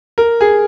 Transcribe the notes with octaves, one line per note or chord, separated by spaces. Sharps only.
A#4
G#4